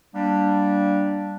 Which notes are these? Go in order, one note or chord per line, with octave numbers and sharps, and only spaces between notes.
G3 A#3 D4